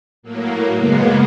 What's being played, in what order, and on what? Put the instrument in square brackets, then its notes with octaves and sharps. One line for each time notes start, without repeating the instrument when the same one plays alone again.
[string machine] A2 F#3 A#3
F#2 C#3 G#3 A#3 B3